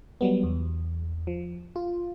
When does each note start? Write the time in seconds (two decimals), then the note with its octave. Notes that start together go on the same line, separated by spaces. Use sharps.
0.21 F#3 G3 B3
0.43 E2
1.27 F3
1.76 F4